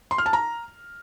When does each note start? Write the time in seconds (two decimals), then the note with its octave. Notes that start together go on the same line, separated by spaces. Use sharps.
0.11 C6
0.18 F6
0.26 A5
0.33 A#5